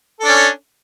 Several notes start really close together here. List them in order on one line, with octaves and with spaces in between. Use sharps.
A4 D4 C#4